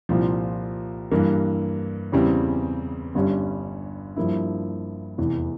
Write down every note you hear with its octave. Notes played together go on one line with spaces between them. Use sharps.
C2 A#2 F3
G2 E3 A#3
E2 C#3 E3 G3 C4
G1 G2 G3 C#4
G2 F3 A#3 E4
F1 E2 E3